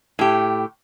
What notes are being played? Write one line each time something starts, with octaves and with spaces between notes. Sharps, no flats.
A2 G4